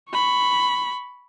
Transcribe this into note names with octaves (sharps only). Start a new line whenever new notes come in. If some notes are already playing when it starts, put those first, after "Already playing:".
B5 C#6